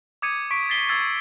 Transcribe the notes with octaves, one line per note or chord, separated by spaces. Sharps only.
D6 D#6 G#6 C#7 D#7
C#6 B6 D7
A6 B6 C7 G7
E6 G#6 A6 C7 G7